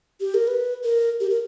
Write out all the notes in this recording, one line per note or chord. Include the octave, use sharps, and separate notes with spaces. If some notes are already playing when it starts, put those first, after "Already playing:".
G4
A#4
B4
A#4
G4
A#4